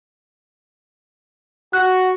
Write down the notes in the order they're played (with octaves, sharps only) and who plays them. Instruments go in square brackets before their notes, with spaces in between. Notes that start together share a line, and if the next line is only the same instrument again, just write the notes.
[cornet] F#4 [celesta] F#6